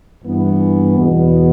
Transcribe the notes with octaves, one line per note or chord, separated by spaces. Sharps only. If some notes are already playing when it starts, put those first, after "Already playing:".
G2 E3 B3
E2 B2 B3